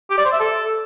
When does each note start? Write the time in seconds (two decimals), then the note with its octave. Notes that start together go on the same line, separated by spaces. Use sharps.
0.10 G4
0.18 D5
0.25 C5
0.32 E5
0.40 A4